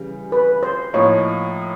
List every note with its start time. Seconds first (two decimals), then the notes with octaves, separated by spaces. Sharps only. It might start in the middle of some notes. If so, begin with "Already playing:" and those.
Already playing: C#3 E3 G3
0.32 B4
0.63 C5
0.93 A2 F3 A#3 D#4 C#5